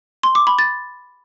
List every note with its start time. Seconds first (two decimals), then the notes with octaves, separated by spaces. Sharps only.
0.23 C6
0.35 D6
0.47 B5
0.59 A6